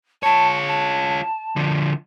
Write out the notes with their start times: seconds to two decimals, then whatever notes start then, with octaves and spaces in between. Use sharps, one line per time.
0.23 F4 C#5 A5
0.67 A5
1.56 D3 F3